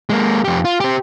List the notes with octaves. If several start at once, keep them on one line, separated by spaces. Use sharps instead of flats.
G#3 A#3
F2 G4
F4
G4 C5